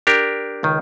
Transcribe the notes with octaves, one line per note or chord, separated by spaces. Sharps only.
D4 G4 A#4
C#2 D#3